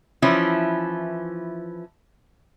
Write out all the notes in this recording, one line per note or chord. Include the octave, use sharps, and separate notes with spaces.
E3 F3 C#4 E4